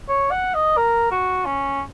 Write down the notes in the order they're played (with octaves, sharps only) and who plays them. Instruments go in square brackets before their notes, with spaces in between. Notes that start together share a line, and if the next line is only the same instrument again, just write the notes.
[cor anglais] C#5
F#5
D#5
A#4
F#4
C#4